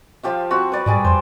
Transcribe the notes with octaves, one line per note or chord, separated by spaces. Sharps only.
F3 G4 F5
C4 F#4
B4 D5
G#2 G3 G#4 D5
F2 C5